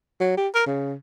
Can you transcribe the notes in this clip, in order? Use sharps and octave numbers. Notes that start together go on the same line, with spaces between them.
F#3
G4
A#4
C#3